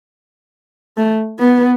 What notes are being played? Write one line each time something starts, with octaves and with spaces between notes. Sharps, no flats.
A3
B3